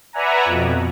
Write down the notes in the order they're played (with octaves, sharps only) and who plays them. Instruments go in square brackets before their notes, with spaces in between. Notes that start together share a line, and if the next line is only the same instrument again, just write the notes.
[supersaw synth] B4 D5 E5 F#5 G#5 A#5
F2 B2